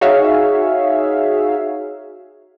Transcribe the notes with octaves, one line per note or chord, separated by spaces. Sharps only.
D#4 F#4 G#4 C#5 E5 F5